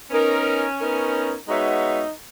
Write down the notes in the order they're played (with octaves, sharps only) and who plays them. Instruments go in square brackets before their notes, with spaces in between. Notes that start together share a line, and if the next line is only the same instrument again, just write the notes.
[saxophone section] B3 D#4 A#4 [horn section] C#4
[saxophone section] B3 D#4 A#4
[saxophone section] G#3 B3 F#4 C#5 E5 [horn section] D#4